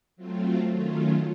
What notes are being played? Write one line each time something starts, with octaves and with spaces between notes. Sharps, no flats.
F#3 A3 C4 F4
D#3 F#3 A3 C#4 F4